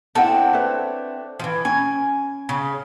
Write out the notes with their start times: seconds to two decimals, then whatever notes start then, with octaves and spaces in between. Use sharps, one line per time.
0.15 C4 D4 E4 A4 F#5 A5
0.53 B4 C#5 E5
1.39 E3 F3
1.65 C#4 G#5
2.49 C#3